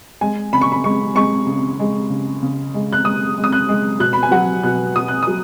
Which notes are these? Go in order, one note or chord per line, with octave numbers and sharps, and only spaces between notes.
G#3 G#5
C#3 B5
C#6
B5
G#3 C#6
G#3 C#6
C#3
G#3
C#3
C#3
G#3
F#6
G#3 D#6
G#3
D#6
F#6
G#3
B2 F#6
B5
G#5
F#3 F#5
B2 F#6
B2 D#6
F#6
F#3 D#6